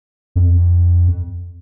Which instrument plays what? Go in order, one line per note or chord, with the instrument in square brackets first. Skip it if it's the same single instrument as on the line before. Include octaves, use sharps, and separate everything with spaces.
[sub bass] F2